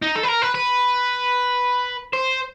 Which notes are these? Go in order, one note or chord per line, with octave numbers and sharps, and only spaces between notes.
D#4
A4
B4
A#4
B4
B4
C5